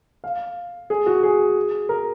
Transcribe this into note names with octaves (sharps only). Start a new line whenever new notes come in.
F5
G#4
F#4
G#4
A#4